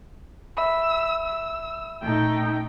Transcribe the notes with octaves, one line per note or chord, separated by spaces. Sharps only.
E5 B5 E6
E6
A#2 A3 C#4 D#4 G5